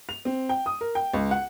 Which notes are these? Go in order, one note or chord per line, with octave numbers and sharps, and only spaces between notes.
F7
C4
G5
D#6
A#4
G5
C#2
F#5